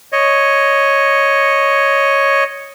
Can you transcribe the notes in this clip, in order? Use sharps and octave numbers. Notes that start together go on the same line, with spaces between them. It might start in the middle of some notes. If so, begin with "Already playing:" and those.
C#5 D#5